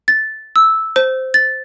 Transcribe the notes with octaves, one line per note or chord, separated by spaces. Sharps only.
A6
E6
C5
A6